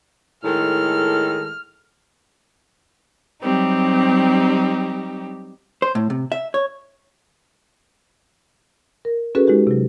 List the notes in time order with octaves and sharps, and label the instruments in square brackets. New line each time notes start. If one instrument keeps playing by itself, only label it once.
[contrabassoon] A2 [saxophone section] D#3 G#3 A4 [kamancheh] F6
[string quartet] F#3 G3 C4 D#4 G4
[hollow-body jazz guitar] C5
A2
C3
E5
C#5
[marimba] A#4
C#4 F#4 G#4 A4 B4
G#3 D#4 F#4 G4
C3 F#3